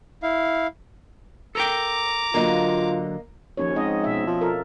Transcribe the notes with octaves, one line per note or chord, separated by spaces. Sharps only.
E4 F5
A4 A#4 G5 A#5 D6
D3 F#3 A#3 F4 D#5
D#2 F3 C#4 C#5
G#2 C4 D#5
B2 E5
F3
F4 A4 A#4